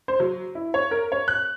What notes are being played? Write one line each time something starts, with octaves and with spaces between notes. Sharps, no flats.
C5
F#3
E4
C#5
A#4
C#5
F#6